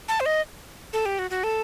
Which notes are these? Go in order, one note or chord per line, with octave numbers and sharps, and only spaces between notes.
A5
C5
D#5
A4
G4
F#4
F#4
A4